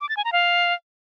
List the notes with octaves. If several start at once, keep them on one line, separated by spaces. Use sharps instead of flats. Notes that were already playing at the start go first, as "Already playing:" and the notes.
D6
A6
G#5
A#5
F5